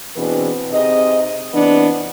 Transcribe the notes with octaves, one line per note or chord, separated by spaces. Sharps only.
B2 E3 C4 D4 G#4 B4
C3 D#4 G#4 D#5
C3 E3 B3 D4